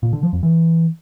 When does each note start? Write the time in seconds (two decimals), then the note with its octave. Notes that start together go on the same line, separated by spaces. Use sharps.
0.03 A#2
0.13 D3
0.23 F3
0.33 F2
0.43 E3